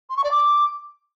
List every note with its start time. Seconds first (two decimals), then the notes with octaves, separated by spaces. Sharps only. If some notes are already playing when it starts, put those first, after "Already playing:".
0.10 C6
0.17 C#6
0.24 D5
0.31 D6